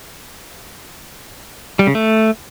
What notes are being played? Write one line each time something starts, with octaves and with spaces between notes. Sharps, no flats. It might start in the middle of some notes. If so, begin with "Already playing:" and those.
G3
C#3
A3